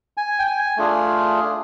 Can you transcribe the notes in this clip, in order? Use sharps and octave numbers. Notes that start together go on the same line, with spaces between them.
G#5
G5
G#5
A3 D4 F4 G#4